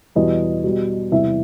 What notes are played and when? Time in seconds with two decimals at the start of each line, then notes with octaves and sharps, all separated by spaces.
0.15 E2 B2 G3 D#5
0.63 B2 G3
1.12 E2 C3 E3 G3 E5